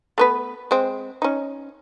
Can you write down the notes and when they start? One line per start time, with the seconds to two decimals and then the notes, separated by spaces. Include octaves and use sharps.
0.18 A3 B3 B4
0.71 G#3 C4
1.22 C#4 D#4